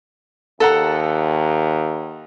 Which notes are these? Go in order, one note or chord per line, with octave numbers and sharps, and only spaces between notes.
D#2 A4 F#5 A#5